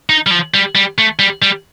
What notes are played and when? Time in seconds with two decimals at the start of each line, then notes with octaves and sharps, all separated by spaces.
0.09 D#4
0.26 G3
0.31 F3
0.54 G3
0.75 G3
0.98 A3
1.19 G3
1.42 G3